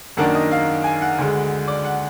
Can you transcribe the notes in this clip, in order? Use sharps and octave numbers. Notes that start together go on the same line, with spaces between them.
F#2 D#3 A#3 D4 F#5
D#5
F5
G#5
F#5
D2 D3 G#3
D5
F#5